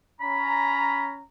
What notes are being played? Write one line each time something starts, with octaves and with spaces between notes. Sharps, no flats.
C#4 A#5 B5